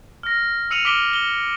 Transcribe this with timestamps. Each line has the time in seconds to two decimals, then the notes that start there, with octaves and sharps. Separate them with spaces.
0.23 F6 A#6
0.71 E6 C#7 D#7 F7 F#7
0.85 D6 F6 B6 D7 G7
1.13 G7